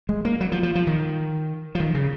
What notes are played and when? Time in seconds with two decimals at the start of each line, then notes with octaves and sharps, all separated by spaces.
0.09 G#3
0.25 A#3
0.41 F#3
0.52 F3
0.63 F3
0.75 F3
0.87 D#3
1.75 F3
1.80 D#3
1.95 C#3